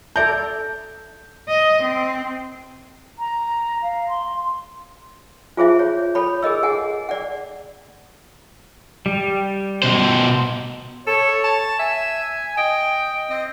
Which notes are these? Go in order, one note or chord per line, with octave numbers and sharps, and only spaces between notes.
A4 D5 E5 A5 A#5 G6
D#5
C4
A#5
F5
C6
F4 G#4 C5 E5
C#5
A4 C#5 B5
G#4 A#4 D#5 E6
G#4 F#5 G#5
D5 F#5
G3
B2 C5
A4 C#5
A5
E5 G#5
D#5 G5
C4 D#5